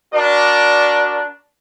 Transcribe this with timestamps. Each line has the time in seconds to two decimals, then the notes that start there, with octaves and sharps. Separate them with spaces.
0.13 D4 F#4 A#4 D5